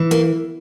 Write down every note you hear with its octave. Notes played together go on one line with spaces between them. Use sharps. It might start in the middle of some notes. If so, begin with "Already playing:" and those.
Already playing: E3
A#3